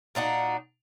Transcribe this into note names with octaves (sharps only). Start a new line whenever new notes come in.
A#2 D4 D#4 F#4